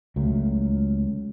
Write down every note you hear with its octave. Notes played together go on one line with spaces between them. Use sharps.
C#2 F#3 A3